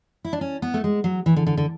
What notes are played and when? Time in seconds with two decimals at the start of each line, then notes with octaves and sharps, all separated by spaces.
0.25 E4
0.33 D4
0.41 C#4
0.62 B3
0.74 A3
0.84 G#3
1.04 F#3
1.26 E3
1.36 D3
1.47 D3
1.57 D3